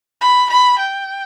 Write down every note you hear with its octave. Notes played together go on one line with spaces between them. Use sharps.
B5
B5
G5